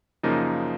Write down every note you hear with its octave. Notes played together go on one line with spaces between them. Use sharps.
F#2 C#3 F3 A#3 D#4